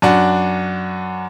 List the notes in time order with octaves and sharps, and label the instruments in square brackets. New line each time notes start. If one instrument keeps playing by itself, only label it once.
[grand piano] F#2 D4 F#4